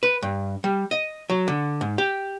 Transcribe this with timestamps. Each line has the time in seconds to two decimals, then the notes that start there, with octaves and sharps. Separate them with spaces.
0.03 B4
0.23 G2
0.64 G3
0.91 D#5
1.30 F#3
1.48 D3
1.81 G#2
1.98 G4